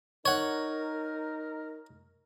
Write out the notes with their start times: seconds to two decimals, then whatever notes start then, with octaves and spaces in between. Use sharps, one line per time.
0.26 D#4 A#4 C#5 F#5